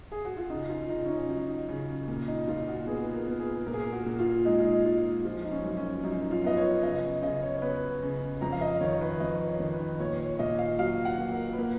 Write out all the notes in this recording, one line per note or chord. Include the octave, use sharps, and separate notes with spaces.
G#4
F#4
F4
C#3 D#4
F4
C#3 D#4
C#4
D#4
F#3 D#4
C#3
A#2
D#4
A#2 F4
F#4
B3 G#4
A#4
B3
G#4
A#2 A#4
G#4
A#4
F#4
A#2
F4
G#3 D#4
F4
D#4
G#3 F4
F3 F4
D#4
C#4
F#2
C#4
F#2 D#4
F4
B3 D#5
C#5
C#3 D#5
C#3 D#5
C#5
C#5
B3 B4
C#3
F2 A#5
F5
D#5
D#3 C#5
B4
F2 D#5
C#5
D#3
B4
A#2 C#5
C#5
A#2 D#5
F5
F#3 F5
F#5
A#2
A#4
B4
A#3 A#4